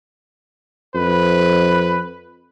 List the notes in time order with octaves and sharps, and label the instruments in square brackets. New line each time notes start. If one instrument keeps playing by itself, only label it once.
[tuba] F2 [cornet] B4